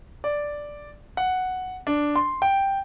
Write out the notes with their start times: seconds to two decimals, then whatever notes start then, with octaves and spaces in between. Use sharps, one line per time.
0.24 D5
1.17 F#5
1.87 D4
2.16 C6
2.42 G5